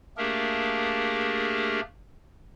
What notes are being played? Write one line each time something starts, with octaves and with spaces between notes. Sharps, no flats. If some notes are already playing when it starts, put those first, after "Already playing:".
A3 A#3 D4 G4 G#4 A#4